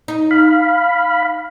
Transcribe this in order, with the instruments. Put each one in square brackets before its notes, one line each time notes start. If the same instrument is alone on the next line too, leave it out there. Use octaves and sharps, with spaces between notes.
[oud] D#4
[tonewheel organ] F5 B5